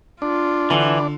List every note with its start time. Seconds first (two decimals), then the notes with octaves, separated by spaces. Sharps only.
0.22 D4 F4
0.70 D3 E3